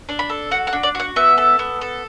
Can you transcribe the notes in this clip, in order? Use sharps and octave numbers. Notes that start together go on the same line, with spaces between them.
D4
B5
A4
F#4 F#5
F#5
D4
D5
F#4 F#5
B3 E5
A4
B3
A4